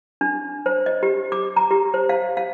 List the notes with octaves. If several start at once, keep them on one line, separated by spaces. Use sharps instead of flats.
D4
C5
D#5
G4
D6
A#5
G4
C5
F5
F5